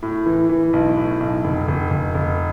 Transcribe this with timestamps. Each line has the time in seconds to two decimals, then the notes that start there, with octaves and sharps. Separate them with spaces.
0.02 A2
0.26 E3
0.49 E3
0.73 B1
0.96 A2
1.20 B1
1.44 F1
1.68 F1
1.90 F1
2.14 F1